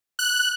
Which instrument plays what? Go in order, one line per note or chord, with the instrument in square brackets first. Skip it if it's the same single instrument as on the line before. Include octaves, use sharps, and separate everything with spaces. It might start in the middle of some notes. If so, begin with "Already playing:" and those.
[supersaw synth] F#6